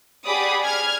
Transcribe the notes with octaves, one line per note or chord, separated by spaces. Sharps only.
G4 G#4 D5 F#5 B5 D#6
F6 G#6